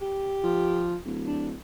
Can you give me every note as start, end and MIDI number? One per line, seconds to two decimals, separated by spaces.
0.01 0.87 67
0.43 0.97 53
1.05 1.53 26
1.28 1.48 62